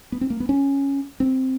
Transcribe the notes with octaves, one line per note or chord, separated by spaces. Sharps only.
B3
C4
A#3
B3
C#4
C4